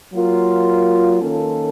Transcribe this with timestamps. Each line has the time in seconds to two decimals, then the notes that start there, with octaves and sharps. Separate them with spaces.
0.13 F#3 A#3 F4 A#4
1.21 D#3 A#3 C#4 A4